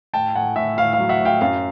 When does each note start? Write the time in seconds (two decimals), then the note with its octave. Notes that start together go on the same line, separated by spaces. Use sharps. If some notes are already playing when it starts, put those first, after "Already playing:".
0.13 A2 G5 A5
0.35 A2 F#5 G#5
0.56 A2 E5
0.77 A2 F5
0.93 F5
0.99 F#3
1.09 E5 F#5
1.21 A2 F5 G5
1.41 F#2 F5